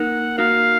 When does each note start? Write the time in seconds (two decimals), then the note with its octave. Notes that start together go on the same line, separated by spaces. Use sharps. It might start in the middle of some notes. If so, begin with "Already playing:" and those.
Already playing: A#3 D#4 A#4 F#5
0.38 A#3 D#4 F#4 A#4 F5